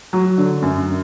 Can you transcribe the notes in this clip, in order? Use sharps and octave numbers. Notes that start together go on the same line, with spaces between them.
F#3
D3
F#2